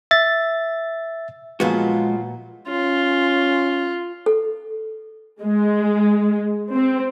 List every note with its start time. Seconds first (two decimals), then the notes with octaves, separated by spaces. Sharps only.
0.11 E5 A6
1.60 A#2 F3 F#3 G#3 B3 F4 F#4
2.68 C#4 F4
4.26 A4
5.42 G#3
6.73 C4